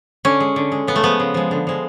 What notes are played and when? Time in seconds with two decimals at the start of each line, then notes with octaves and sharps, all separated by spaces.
0.25 D3 C#4
0.40 G#3
0.56 D3
0.72 G#3
0.87 C#3 B3
0.96 A3
1.03 F3 G#3 B3
1.20 C#3
1.34 F3 G#3
1.51 D3
1.67 F3 G#3